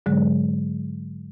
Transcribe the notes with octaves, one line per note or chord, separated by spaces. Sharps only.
G#2 D3 F#3 G#3